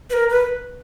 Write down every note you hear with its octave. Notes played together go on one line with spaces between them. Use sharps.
B4
A#4
B4